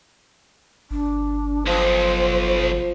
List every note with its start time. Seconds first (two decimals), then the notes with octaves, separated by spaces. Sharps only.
0.91 G1 D4
1.67 B1 F3 C5